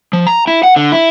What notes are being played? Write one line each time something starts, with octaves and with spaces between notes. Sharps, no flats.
F3
A#5
E4
F#5
D3
E4